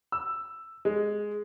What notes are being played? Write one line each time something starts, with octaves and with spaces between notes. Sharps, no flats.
E6
G#3